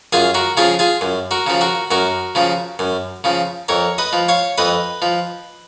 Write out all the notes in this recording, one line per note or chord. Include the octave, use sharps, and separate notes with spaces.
F#2 F4 G#4
F#4 A#4
C#3 F3 F4 G#4
F4 G#4
F#2
F#4 A#4
C#3 F3
F#4 A#4
F#2 F#4 A#4
C#3 F3
F#2
C#3 F3
F2 A#4 C#5
B4 D#5
F3
C#5 F5
F2 B4 D#5
F3